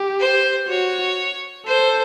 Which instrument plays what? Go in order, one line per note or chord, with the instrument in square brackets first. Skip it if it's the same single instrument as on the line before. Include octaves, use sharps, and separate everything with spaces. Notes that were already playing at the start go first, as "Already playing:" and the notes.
Already playing: [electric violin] G4
[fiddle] C5
[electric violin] F#4 [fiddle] C#5
[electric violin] A4 [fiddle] C5